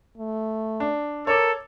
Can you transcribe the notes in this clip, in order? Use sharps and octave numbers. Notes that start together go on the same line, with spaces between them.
A3
D4
A4 A#4 C#5 D6